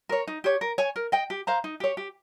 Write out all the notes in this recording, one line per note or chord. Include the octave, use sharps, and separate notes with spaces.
A#4 C#5
D#4
G4 C#5
A#4
C#5 G#5
A#4
D#5 G5
G4
C5 F5 A#5
D#4
G4 C#5
G4